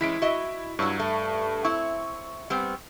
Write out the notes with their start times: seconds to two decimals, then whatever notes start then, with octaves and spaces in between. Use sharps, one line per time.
0.01 E3 G#3 C#4 E4 B6 D7
0.22 F#4 D#5 E5
0.79 G2 F#3 E4 C#5 C#6
0.99 A3
1.65 C4 E4 C#6
2.50 G3 B3 C4